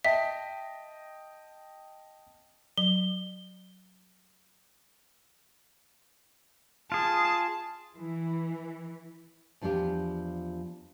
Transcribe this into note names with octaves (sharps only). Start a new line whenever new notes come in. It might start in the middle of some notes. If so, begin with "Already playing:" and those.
D#5 E5 G5 A5 B6
F#3 G7
F4 G#4 A5
E3
E2 F3 D4 F4 G4